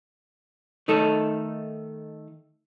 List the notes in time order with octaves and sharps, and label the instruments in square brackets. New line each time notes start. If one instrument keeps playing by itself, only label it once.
[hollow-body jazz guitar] D#3 A3 D#4 A4